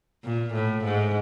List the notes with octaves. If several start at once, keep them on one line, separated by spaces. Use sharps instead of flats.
A#2
A2
G#2